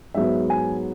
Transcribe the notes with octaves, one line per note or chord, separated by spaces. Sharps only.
G#2 F#3 B3 E5
G#5